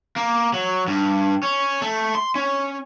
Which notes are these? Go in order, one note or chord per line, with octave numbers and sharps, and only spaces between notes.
A#3
F#3
G2
C#4
A3
C6
C#4